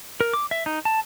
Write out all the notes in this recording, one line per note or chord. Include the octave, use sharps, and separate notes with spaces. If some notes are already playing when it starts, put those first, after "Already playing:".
A#4
D6
E5
D#4
A5